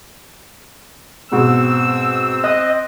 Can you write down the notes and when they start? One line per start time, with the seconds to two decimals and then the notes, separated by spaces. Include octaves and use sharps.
1.32 G#2 B2 C4 E6
2.44 D#5 F#6